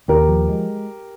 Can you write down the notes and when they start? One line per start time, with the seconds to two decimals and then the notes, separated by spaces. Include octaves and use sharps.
0.08 D#2 G4 A#4
0.29 F3
0.48 G#3